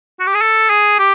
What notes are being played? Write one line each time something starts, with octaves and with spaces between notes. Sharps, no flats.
F#4
G4
G#4
A4
G#4
G4